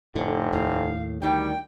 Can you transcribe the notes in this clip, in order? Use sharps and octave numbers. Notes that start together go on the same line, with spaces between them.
F1 A2 D3
D#2 A2 F5
D2 D#3 G3 G5